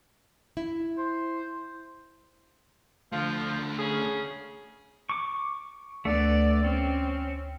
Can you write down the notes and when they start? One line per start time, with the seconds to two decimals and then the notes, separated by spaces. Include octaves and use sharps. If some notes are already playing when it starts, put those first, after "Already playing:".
0.57 E4
0.98 C5
3.12 D3 F3 A3
3.77 C#3 C#4 G#4
5.09 C#6 D6
6.05 D2 A3 B3 D5
6.64 C4 C#4